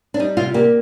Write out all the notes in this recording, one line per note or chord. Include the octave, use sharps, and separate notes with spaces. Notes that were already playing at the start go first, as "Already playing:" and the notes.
D4
G3 D#4
C3 F4
A#3 G4